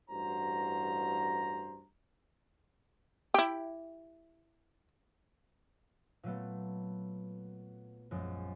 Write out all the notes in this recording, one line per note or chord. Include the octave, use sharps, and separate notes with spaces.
A1 G2 F#4 C5 A#5
E4 G4
A#2 F#3 A3 B3
A#1 F#2 G#3